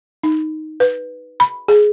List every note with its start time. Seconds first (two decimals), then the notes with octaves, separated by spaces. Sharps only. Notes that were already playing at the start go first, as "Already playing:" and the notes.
0.23 D#4
0.80 B4
1.40 B5
1.68 G#4